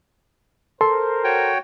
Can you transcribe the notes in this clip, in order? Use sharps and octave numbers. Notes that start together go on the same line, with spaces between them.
A4 A#4 C5 C6
F#4 C#5 G5